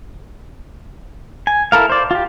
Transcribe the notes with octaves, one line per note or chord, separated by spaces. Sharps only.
G#5
E4 A4 A#4 F5
C5 D5
F4 G4